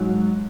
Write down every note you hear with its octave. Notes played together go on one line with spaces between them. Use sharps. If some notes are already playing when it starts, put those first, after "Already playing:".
Already playing: G#2 F#3